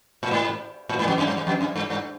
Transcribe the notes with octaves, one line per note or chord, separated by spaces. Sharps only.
A2
G#2
A2
G#2
F2
F#2
G2
F#2
F2
F#2
G2
G2